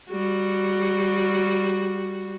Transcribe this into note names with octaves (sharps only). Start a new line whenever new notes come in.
G3 F#4